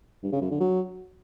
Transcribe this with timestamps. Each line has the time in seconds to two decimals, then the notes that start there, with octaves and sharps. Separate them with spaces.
0.23 G2
0.32 C#3
0.42 F#2
0.51 D3
0.60 F#3